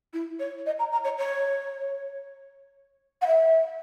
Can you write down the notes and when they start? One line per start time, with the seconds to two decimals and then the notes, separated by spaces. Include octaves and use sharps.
0.13 E4
0.40 C#5
0.66 D#5
0.79 A#5
0.92 A#5
1.04 C#5
1.18 C#5
3.22 F#5
3.27 E5